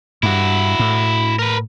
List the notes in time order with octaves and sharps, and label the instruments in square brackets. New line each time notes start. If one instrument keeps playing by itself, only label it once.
[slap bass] G2 [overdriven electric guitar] E4 F#4
[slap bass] A2
[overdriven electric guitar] A#4 B4